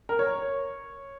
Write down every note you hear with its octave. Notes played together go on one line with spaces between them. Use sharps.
A#4
C#5